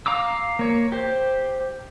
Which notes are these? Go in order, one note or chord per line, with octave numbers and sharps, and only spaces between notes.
F5 A#5 D6 E6
A#3 C#5
G4 C5